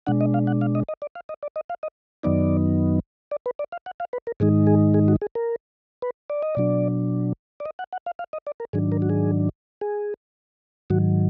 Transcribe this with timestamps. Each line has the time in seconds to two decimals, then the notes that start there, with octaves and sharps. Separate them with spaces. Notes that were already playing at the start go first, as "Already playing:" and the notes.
0.07 B2 G#3 D4 F#5
0.21 D#5
0.34 F5
0.47 F#5
0.61 F5
0.75 D#5
0.89 D#5
1.02 D5
1.15 F5
1.29 D#5
1.43 D5
1.56 D#5
1.70 F5
1.83 D#5
2.23 F#2 D#3 F#3 B3 D#4 D5
3.31 D5
3.46 B4
3.59 D5
3.72 F5
3.86 F#5
4.00 F5
4.13 B4
4.27 A#4
4.40 G#2 D#3 G#3 D#4 G#4
4.67 G#4
4.94 G#4
5.08 F#4
5.22 G#4
5.35 A#4
6.02 B4
6.30 D5
6.43 D#5
6.55 B2 F#3 D4 D5
7.60 D5
7.65 D#5
7.79 F#5
7.93 F#5
8.06 F5
8.19 F5
8.33 D#5
8.47 D5
8.60 A#4
8.73 G#2 D#3 F#3 D4 G#4
8.92 A#4
9.02 F#4
9.10 G#4
9.81 G#4
10.90 G#2 D#3 F#3 F#4